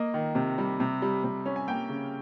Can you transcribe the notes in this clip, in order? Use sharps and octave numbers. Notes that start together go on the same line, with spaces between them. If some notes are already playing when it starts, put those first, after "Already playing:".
Already playing: A#3 D#5
D#3
C3
G3
C3
G3
C3
C#4
G#5
A#3 G5
C#3